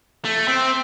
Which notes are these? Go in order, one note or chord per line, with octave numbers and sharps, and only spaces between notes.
A3
C4